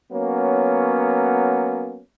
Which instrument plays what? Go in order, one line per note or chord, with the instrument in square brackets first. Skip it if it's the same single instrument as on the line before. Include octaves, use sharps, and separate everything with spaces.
[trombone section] F#3 A#3 B3 C#4